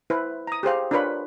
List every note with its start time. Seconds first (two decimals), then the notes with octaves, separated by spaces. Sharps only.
0.10 E4 B4 C5
0.47 A#5 D#6
0.63 G4 G#4 C5 F5
0.91 D4 F4 A#4 B4 C#5 B5